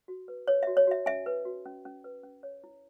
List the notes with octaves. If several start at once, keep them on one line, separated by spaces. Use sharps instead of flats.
F#4
B4
B4 C#5
F#4 E5
C#5
F#4 E5
C#4 E5 G#5
B4
F#4
C#4
C#4
B4
C#4
C#5
E4